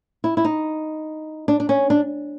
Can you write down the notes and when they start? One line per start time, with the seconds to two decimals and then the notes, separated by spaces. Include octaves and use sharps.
0.24 E4
0.37 E4
0.45 D#4
1.48 D4
1.60 D4
1.69 C#4
1.90 D4